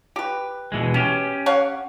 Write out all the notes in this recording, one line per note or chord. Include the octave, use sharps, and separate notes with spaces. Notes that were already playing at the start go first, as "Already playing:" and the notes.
G4 B4
B2 E3 G#3
B2 C#4 G4
C#5 F5 F#5